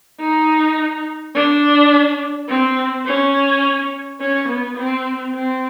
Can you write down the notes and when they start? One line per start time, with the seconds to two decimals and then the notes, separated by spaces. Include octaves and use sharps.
0.20 D#4
1.35 D4
2.49 C4
3.05 C#4
4.20 C#4
4.48 B3
4.77 C4
5.34 C4